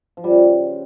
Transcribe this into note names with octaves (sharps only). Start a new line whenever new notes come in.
F3
G3
C#3